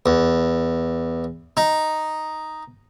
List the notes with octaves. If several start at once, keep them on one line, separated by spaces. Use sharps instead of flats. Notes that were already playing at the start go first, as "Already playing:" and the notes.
E2
D#4